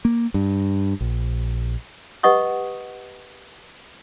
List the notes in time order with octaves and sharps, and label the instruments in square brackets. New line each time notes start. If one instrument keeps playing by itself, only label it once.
[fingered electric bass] A#3
G2
A#1
[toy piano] G4 B4 D#5 F#5 C#6 D#6